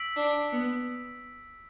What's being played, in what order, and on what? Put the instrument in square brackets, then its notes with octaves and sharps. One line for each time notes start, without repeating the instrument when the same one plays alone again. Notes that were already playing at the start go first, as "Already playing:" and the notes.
Already playing: [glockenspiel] E6 B6 D7 F#7
[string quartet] D4
B3